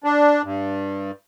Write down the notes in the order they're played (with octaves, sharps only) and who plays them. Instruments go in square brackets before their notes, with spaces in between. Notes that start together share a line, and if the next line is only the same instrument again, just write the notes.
[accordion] D4
G2